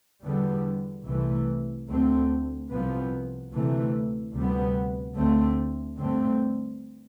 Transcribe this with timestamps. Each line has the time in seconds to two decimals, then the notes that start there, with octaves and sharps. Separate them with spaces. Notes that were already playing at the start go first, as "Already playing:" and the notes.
0.23 E2 D3 G3 B3
1.06 C2 C3 E3 A3
1.88 D2 D3 A3 C4
2.70 C2 C3 F3 B3
3.52 D2 C3 E3 A3
4.34 D2 C3 G3 B3
5.16 D2 D3 A3 C4
5.97 G2 D3 A3 C4